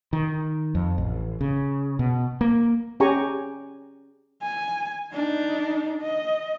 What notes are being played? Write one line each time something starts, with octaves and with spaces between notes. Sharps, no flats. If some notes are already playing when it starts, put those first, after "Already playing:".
D#3
F2
A1
C#3
B2
A#3
C#4 G4 G#4 G#5 A#5 C#6
G#5
D4 D#4
D#5